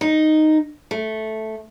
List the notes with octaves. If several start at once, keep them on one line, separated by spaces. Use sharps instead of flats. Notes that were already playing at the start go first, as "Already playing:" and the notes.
D#4
A3